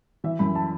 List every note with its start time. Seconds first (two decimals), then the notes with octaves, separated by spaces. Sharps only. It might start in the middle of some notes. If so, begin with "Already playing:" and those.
0.24 E3 E5
0.39 F#2 B5
0.55 A5